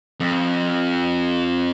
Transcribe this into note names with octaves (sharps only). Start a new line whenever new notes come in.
F2